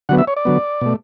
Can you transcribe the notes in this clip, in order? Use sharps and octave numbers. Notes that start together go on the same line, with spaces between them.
D3 F#3 B3 F#5
E5
C#5
D5
D3 F#3 B3
B2 A3